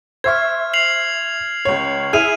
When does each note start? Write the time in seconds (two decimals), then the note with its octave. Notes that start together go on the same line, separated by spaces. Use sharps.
0.24 C5 E5 C#6 F6 G#6
0.74 C7 F7 F#7
1.65 C#2 C#5
2.13 E4 G#4 F6 D#7 F7